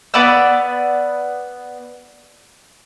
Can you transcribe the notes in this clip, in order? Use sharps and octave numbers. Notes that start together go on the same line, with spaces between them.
B3 D5 B5 E6